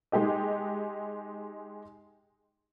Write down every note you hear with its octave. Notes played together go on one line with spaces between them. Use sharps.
G#3 D#4 G4 D#5